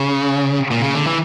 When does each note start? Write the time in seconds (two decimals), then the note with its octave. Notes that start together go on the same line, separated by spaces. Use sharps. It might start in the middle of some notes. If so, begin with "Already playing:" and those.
Already playing: C#3
0.71 A#2
0.83 C#3
0.95 D3
1.07 E3